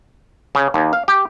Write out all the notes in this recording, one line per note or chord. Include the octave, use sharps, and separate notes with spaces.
C#3
D#2
F5
G4